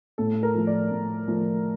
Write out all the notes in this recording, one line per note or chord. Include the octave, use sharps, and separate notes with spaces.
A2 A4
A#4
F3 A3
D5
A2
F3 A3